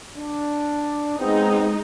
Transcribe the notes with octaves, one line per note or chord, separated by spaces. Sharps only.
D4
G#3 B3 C4 D#4